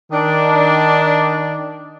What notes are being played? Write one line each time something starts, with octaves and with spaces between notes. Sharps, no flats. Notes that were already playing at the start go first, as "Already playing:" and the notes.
D#3 D4